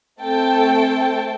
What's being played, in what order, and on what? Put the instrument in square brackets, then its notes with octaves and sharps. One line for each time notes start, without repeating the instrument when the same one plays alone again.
[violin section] A3 C4 A4 G5 A5